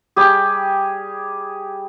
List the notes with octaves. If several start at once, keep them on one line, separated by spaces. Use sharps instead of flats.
G3 G4 G#4